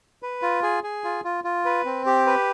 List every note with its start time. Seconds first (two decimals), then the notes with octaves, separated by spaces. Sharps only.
0.23 B4
0.42 F4
0.63 G#4
0.84 G#4
1.04 F4
1.24 F4
1.44 F4
1.65 B4
1.85 C4
2.06 G4
2.26 B4